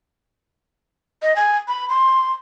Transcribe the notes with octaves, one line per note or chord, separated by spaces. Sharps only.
D#5
G#5
B5
C6